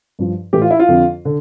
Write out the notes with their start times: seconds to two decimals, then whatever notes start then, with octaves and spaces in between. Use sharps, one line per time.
0.19 G2 F3
0.53 A2 E3 G4
0.62 F4
0.71 E4
0.79 F4
0.88 F2 D3 F3
1.25 D3